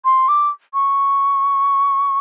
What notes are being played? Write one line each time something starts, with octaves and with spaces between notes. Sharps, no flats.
C6
D6
C#6